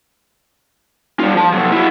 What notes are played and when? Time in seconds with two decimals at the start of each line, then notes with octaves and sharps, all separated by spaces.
1.20 G3 F4
1.35 F3 A5
1.53 C3 F#3
1.72 E4 F#4